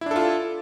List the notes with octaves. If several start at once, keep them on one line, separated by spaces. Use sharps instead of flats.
D4 E4 F4 A4